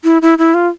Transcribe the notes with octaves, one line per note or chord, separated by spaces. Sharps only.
E4
E4
E4
F4